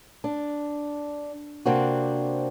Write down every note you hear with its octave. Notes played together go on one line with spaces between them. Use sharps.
D4
C3 A#3 C4 D4 F#4